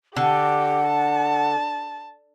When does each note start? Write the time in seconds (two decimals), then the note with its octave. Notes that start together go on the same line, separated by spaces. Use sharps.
0.16 D3 G4 F#5
0.87 A5